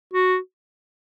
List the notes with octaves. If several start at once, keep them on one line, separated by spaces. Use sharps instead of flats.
F#4